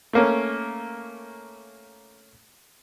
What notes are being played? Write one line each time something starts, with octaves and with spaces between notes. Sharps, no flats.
A3 A#3 C#4